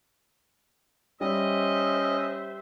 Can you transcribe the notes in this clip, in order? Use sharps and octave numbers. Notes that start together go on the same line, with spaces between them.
G3 C#4 C5 D#5 E5